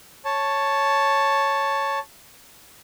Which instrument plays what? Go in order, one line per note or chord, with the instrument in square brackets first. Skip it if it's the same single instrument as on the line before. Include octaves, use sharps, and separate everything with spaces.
[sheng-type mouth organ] C#5 A5